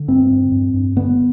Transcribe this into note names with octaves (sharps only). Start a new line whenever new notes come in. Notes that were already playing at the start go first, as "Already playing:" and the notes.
Already playing: D3
G2 C4
G2
G2
G2
D3 B3